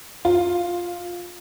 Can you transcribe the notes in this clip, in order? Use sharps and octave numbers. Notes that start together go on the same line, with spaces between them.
F4